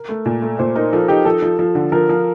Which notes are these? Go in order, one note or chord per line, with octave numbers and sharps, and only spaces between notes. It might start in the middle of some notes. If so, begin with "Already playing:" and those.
Already playing: A#4
A3
A#2
A3
A#2 C5
D#4 A#4
F3 A4
D#4 G4
F3 A4
F3
F3
D3
F3 A#4
F3